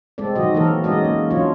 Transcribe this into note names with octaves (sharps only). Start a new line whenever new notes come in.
G#3 C4 A4 D5
D#3 F#3 F#4 D#5
E3 A#3 C4 A4 A#4
G#3 C#4 F#4 D5 D#5
A#3
F#3 C#4 D4 F4 C#5